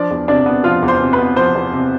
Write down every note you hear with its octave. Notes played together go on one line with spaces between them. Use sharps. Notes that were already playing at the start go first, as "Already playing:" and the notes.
Already playing: F3 D4 D5
E2
C3 D4 D5
B3
F3 F4 F5
E2
C5 C6
C3
B4 B5
B3
F3 C5 C6
E2
C3